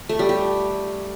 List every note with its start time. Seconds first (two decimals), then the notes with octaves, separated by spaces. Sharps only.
0.09 A3
0.19 G3
0.29 G4